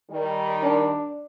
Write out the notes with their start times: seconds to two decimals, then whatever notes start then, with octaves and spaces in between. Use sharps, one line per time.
0.10 D#3 G3
0.63 D4